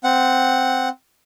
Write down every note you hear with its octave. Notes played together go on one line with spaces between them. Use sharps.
C4 F#5